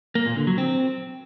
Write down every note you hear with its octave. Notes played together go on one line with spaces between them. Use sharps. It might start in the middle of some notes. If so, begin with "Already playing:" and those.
A#3
A#2
D3
F#3
C4